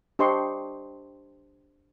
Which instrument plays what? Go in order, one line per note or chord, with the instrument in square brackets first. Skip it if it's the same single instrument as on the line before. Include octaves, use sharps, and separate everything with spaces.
[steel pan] D4 G4 C5 D#5 C6 C#6